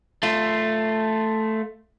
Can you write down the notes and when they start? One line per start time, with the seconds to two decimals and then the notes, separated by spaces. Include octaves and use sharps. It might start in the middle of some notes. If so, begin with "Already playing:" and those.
0.23 A3 F4